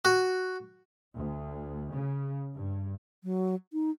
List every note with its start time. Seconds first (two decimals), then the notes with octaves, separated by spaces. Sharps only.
0.05 F#4
1.15 D2
1.93 C#3
2.54 G2
3.24 F#3
3.73 D#4